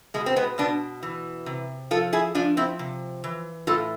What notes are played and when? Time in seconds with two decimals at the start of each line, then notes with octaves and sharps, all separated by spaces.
0.14 B2 G#3
0.26 C4
0.36 G#3 B3
0.58 B2 B3 D4
1.03 E3
1.46 C3
1.91 F3 F4 A4
2.13 E4 G#4
2.35 F3 D4 F4
2.57 C4 E4
2.79 C3
3.24 E3
3.67 A2 F4 A4